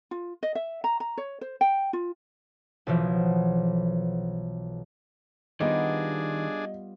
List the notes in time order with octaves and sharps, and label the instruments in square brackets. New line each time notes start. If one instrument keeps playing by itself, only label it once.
[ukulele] F4
D#5
E5
A#5
A#5
C#5
C5
G5
F4
[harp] B1 B2 E3 F3
[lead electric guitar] D#3 [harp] G3 B3 F4 [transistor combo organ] D4 G#4 [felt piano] D#5